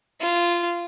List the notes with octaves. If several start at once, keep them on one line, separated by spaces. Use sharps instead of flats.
F4